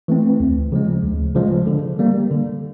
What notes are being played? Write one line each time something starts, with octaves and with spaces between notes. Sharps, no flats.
E3 A3 C4
D2
C#3 F3 G#3
D2
C#3 F3 G#3
D3
G3 A#3
D3